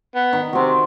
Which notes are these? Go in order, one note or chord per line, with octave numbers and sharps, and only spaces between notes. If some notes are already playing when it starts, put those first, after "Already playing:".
B3
D#3
C3 C4 F#4